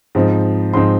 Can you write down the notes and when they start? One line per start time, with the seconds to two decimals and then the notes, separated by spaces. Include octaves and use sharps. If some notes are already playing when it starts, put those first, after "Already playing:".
0.15 G#2 F3 C4 D#4
0.73 G#2 F3 C4 D#4 C6